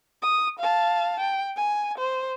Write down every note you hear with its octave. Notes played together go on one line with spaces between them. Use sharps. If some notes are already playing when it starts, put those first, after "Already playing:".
D#6
F5 A5
G5
G#5
C5